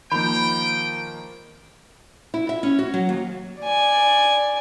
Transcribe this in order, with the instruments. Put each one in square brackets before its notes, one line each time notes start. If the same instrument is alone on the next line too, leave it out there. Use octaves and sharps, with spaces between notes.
[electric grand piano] D#3 F3 A#3 [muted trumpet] G5 [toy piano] B5
[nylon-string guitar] E4
E5
C#4
F#4
F#3
D#2
[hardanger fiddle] D5 G#5